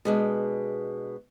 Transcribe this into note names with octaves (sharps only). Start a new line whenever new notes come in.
B2 G#3 D4